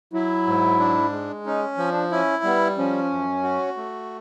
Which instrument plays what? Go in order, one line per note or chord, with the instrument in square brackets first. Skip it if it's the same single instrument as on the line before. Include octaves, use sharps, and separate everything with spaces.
[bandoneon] F#3 [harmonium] E4
[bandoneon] G#2
D4
G#3
[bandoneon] C#4 [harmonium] D#4
[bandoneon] F3
[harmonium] D4
[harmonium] C#4 [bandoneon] E4
[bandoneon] G3 [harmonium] B3
[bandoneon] F3 [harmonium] C#4
[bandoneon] F#2
F#4
A3